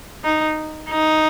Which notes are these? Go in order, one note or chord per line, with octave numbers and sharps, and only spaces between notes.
D#4
D#4